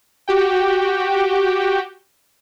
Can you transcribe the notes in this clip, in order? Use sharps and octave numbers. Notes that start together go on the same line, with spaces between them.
F#4 G4 G5